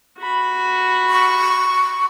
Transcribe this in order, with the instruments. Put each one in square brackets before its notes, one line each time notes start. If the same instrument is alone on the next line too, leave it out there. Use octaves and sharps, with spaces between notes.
[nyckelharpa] F#4 B5
[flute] C#6